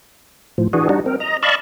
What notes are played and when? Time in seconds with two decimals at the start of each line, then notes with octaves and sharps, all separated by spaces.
0.58 A2 F3
0.73 E3 D4 F#4 G#4
0.89 G3 D4 D#4 F#4
1.06 C4 A#4
1.20 D#5 A#5
1.43 D5 D#5 F5 A5 B5 C#6